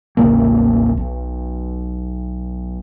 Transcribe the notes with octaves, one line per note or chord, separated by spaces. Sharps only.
A1 D#2 C#3 A#3
B1